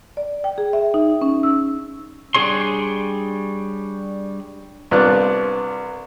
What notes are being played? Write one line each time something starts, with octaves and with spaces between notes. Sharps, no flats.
D5
G5
G#4
E5
D#4
C#4
E6
G3 D4 G#4 C#5 C6
C2 B3 D4 F4 D5 F#6